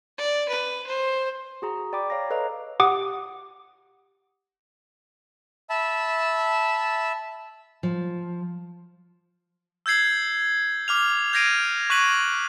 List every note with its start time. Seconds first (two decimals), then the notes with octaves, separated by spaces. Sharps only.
0.18 D5
0.49 B4
0.87 C5
1.62 F#4 G#4 A#5
1.93 D5 G5 B5 D6
2.10 C#5 F5 A#5 A#6
2.30 A4 B4 C#5 D#5 F5 A#5
2.80 G4 F#5 D6 D#6
5.70 E5 A5 B5
7.83 F3
9.86 E6 G6 G#6 C7 F#7
10.88 D6 F6 F7
11.33 G6 G#6 A#6 C7 D7 D#7
11.90 C#6 F#6 B6 D#7 F#7